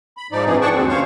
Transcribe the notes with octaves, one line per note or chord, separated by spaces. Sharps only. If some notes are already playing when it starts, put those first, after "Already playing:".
B5
G#2 F3 D#4 D5
G2 C3 E3 F3 G#4
G#4 D5 F#5 G5 A5 C#6
D#2 B2 D3 G#3 C4
F#2 C5 C#5 F5 C#6